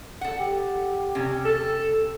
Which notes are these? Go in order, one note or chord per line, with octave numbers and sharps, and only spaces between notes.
A4 F#5
G4
C3 C#4 G5
A4